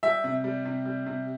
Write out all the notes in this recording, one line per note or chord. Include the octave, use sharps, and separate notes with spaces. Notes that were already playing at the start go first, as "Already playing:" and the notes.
G3 E5
C3
G3
C3
G3
C3